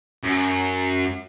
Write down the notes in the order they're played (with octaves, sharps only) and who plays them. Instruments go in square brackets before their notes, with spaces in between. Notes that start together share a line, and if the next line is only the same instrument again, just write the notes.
[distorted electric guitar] F#2